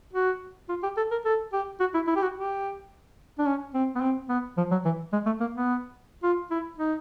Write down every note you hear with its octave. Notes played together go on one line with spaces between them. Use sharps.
F#4
F4
G4
A4
A#4
A4
G4
F#4
E4
E4
G4
F#4
G4
D4
C#4
C4
B3
C4
B3
F3
F#3
E3
G#3
A3
A#3
B3
F4
E4
D#4